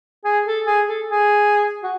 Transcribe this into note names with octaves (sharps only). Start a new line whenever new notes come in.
G#4
A4
G#4
A4
G#4
F#4